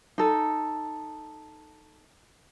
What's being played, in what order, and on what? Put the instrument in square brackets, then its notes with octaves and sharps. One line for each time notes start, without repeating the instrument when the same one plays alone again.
[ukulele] D#4 A4